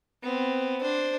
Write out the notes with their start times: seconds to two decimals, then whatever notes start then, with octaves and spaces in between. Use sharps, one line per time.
0.23 B3 C4
0.82 D4 C5